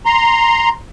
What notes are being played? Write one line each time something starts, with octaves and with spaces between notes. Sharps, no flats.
A#5 C6